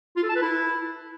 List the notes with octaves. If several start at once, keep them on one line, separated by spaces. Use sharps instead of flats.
F4
A4
A5
B4
E4